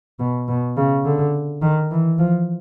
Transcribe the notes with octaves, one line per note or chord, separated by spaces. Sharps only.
B2
B2
C#3
D3
D#3
E3
F3